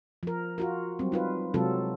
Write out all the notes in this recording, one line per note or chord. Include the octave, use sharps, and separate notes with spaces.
F3 A#4
F4 F#4 A#4
F#3 G3 C4
D#4 F4 B4
C3 F#3 G#3 C4 F4 A4